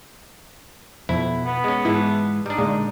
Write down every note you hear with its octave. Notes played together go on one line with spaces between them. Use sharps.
F2 B2 E4
B3
G#3 C#4
G#2 E3 G#3 E4 A5
G3 D4 D#4
A#2 D3 G#3